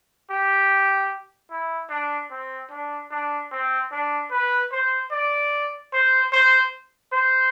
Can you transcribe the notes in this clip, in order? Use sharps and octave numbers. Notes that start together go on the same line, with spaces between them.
G4
E4
D4
C4
D4
D4
C4
D4
B4
C5
D5
C5
C5
C5